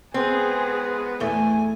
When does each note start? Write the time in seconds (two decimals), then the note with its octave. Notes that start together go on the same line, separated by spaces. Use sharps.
0.14 G#3 B3 C4 G#4
1.20 E2 A3 G#5